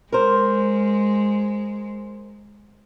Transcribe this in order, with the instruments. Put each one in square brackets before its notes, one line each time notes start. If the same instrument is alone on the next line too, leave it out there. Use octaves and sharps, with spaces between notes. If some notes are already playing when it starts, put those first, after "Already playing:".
[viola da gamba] G#3 [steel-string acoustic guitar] A#4 C5